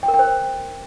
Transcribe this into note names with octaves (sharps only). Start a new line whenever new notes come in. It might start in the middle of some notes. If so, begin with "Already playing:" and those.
G5
A#4
G5
C5